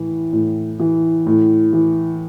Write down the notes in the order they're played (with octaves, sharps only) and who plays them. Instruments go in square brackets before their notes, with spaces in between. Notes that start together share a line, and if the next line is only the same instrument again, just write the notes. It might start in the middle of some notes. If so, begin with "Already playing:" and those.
Already playing: [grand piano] A2 E3
A2
E3
A2
E3